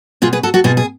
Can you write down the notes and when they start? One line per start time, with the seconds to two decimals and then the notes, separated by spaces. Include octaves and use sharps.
0.22 B2 F4 G#4
0.33 G#4 B4
0.43 F#4 A4
0.54 F#4 A4
0.64 B2 F4 G#4
0.77 G#4